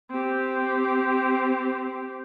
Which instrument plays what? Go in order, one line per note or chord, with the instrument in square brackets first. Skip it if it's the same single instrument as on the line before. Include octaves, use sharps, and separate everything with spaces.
[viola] C4 G4